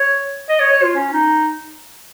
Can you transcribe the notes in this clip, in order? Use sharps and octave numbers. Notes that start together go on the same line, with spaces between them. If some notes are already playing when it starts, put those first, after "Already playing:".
Already playing: C#5
D#5
C#5
C#5
F4
C#4
D#4